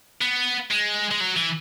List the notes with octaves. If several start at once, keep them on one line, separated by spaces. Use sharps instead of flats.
B3
G#3
G#3
F#3
E3